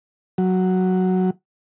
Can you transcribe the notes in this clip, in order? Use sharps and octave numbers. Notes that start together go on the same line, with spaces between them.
F#3